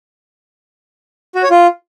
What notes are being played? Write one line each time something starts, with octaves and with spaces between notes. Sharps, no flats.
F#4
C#5
F4